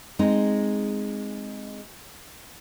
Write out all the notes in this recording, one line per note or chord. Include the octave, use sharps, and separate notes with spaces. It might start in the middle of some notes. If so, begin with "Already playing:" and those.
G#3 C4 D#4